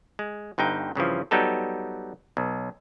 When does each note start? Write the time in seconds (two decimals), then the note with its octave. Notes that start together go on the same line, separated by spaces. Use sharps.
0.19 G#3
0.58 G1 G2 D#4 G5
0.95 G2 C#3 E3 F3
1.31 F#3 G3 B3 D#4 G4 A4
2.37 B1